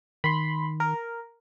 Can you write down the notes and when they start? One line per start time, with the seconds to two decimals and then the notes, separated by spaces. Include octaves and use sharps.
0.24 D#3 B5 C6
0.80 A#4